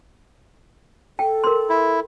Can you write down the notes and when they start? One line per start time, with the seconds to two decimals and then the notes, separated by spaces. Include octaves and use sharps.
1.19 A4 G5
1.44 A#4 C6
1.70 E4